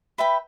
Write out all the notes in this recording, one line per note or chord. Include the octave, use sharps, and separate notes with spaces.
B4 E5 G5 B5